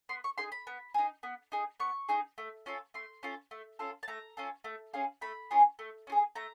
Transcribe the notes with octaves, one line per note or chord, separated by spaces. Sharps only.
B3 C6
C#6
D#4 G#4 C6
B5
B3
D#4 G#4
B3
D#4 G#4
B3 C#6
D#4 G#4
A3
C#4 F4 A4
A3 C6
C#4 F4 A4
A3
C#4 F4 A4
A5
A3 A#5
C#4 F4 A4
A3
C#4 F4 G#4
A3 B5
C#4 F4 G#4
A3
C#4 F4 G#4
A3 A#5